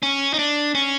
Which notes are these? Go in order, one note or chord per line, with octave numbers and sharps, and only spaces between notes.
C#4
D#4
D4
C#4